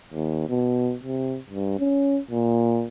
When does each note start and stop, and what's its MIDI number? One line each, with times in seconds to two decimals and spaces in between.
0.13 0.48 39
0.49 0.95 47
1.03 1.38 48
1.50 1.75 43
1.79 2.19 61
2.30 2.86 46